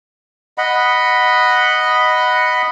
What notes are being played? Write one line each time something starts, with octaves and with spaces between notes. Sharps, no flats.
D#5 F#5 B5